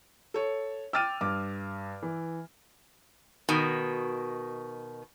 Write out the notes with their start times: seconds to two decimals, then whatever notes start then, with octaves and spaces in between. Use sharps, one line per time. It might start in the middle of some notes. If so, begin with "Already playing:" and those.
0.34 A4 C#5
0.93 G5 D6 E6 F6 A6 D#7
1.21 G2 D6
2.03 E3
3.49 B2 D#3